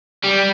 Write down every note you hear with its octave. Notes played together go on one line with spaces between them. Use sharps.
G3